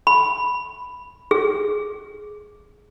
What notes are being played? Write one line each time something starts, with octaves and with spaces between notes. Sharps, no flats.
B5
G#4